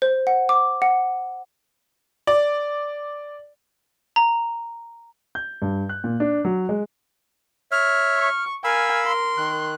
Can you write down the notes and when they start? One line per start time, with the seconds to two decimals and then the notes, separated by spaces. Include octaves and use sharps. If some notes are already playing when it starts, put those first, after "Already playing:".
0.02 C5
0.27 F#5
0.49 D6
0.82 F#5
2.27 D5
4.16 A#5
5.35 G6
5.62 G2
5.89 F#6
6.04 A#2
6.20 D4
6.45 F#3
6.69 G#3
7.72 C#5 E5 F6
8.18 C#6
8.64 A#4 F5 G#5 B5 E6
9.06 C6
9.37 D#3 F#6